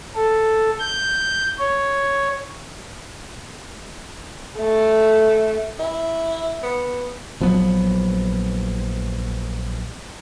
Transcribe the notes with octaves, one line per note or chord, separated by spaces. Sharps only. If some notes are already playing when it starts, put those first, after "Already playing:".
A4
G6
C#5
A3
E4
B3
A#1 F3 F#3 B3